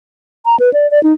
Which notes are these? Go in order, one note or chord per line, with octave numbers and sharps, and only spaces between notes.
A#5
B4
D5
D5
D#4